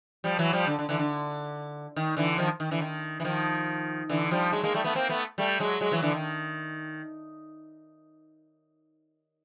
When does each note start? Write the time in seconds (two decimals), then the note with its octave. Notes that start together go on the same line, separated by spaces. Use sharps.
0.24 F3 G3
0.39 E3 F#3
0.53 F3 G3
0.67 D3
0.79 D3
0.89 D3 E3
0.99 D3
1.96 D#3
2.17 D3 E3
2.38 D#3 F3
2.60 D#3
2.71 D3 E3
2.81 D#3
3.20 E3
3.24 D#3 F3
4.09 D3 E3
4.31 F3 G3
4.52 F#3 G#3
4.64 G#3 A#3
4.74 G3 A3
4.84 A3 B3
4.95 A#3 C4
5.09 A3 B3
5.38 G3 A3
5.60 F#3 G#3
5.81 F#3 G#3
5.91 E3 F#3
6.02 D3 E3
6.14 D#3